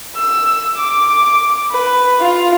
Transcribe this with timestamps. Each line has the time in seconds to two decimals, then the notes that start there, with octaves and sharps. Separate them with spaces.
0.16 E6
0.77 D6
1.72 B4
2.21 F4